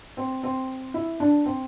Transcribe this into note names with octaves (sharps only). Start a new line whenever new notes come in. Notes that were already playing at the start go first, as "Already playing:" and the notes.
C4
C4
E4
D4
C4